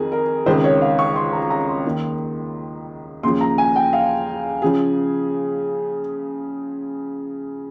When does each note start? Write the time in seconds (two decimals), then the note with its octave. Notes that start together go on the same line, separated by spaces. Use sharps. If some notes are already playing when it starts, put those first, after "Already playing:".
Already playing: F2 D#3 G#4 A#4
0.12 A#4
0.46 C#2 C3 D#3 C5
0.64 C#5
0.82 F5
0.99 C#6
1.16 C6
1.33 A#5
1.50 A#5
1.68 C6
1.85 D#2 D#3
3.23 D#2 C#3 F3 C6
3.41 A#5
3.58 G#5
3.76 G5
3.93 F5
4.62 C#3 F3 G#4